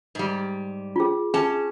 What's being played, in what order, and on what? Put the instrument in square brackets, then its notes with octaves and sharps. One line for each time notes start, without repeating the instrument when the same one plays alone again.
[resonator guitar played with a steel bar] G#2 G3
[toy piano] F4 G#4
[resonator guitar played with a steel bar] C#4 A5 [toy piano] G#4